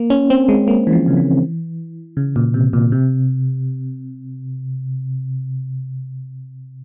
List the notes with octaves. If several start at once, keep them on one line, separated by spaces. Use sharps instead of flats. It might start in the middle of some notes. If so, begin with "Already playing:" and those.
Already playing: A#3
C#4
C4
G#3
A#3
E3
F3
C#3
E3
C#3
A#2
C3
A#2
C3